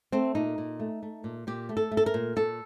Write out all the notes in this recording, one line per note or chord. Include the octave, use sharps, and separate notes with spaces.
A3 C4
A#2 D#4
A#2
A3
A3
A#2
A#2 G4
A3
A4
A3
A4
A#4
A#2
A#2 A4